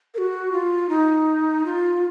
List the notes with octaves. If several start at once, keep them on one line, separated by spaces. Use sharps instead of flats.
A#4
F#4
F4
D#4
F4